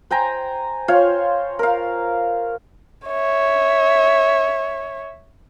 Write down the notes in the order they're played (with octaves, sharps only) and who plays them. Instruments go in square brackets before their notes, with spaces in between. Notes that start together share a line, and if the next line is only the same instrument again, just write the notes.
[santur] C5 G5 G#5 A#5
F4 C5 C#5 F5
A#4 F5
[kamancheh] C#5 E5